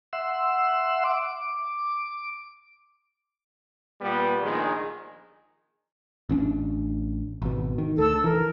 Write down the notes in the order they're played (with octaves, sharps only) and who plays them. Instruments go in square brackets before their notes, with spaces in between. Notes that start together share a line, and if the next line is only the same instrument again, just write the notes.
[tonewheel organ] E5 F#5 C6 E6
D6
[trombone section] A#2 G3 B3
A#1 D#3 G#3
[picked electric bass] A1 C#4 D4
G#1 B2
D#3
[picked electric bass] D2 [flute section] A4 E6
[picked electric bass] E3 [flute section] A#4